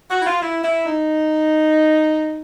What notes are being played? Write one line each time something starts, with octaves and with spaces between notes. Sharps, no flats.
F#4
E4
F4
E4
E4
D#4